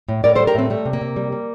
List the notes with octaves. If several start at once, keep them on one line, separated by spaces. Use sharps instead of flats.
A2
A2 A#4 D5
A4 C5
G3
G4 A#4
A2 A3 C4
G3 A3
C3
A#3
C3
G3
G3